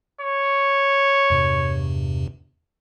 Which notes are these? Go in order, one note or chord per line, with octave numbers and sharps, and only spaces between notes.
C#5
E2 G2 C3